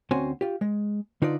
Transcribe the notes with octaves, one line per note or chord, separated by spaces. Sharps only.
D2 C4 C#4 F#4 C5 G#5
F4 G4
G#3
D3 D#4 F4 B4 D5